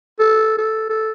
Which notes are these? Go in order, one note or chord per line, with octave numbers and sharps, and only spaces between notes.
A4
A4
A4